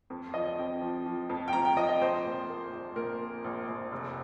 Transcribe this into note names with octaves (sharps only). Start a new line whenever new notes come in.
F2
F3 D#5
D#5
C4 G5
F3
F3
F2
G5
F2 A#5
G5
F3 D#5
D#5
A#1 C5
A#2
A#3
A#1
A#2 A#4
A#3
A#1
A#1
F1